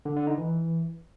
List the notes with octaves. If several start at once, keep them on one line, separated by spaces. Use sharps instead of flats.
D3
D3
D#4
E3